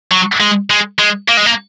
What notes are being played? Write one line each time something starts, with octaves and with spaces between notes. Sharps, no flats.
F#3
G#3
G#3
G#3
A#3
G#3
A#3